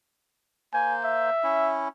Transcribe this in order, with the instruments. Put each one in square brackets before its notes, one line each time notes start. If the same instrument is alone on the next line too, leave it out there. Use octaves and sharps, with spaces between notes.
[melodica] A#3 C5 [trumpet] G#5
[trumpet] E5
[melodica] C#4 E4